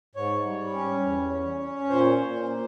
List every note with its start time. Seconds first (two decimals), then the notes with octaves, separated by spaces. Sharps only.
0.15 G#2 C#5
0.45 G3
0.74 C#4
1.03 E2
1.32 C#4
1.61 C#4
1.90 A#2 C5
2.19 A#2
2.48 A#3